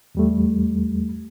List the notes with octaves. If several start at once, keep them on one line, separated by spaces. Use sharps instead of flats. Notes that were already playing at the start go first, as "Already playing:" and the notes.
E2 G3 A3